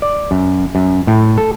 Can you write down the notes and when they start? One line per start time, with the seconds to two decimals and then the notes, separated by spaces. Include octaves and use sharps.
0.02 D5
0.31 F#2
0.75 F#2
1.07 A2
1.38 A4